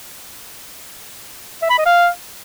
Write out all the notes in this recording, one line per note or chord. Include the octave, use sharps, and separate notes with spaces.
E5
B5
D#5
F5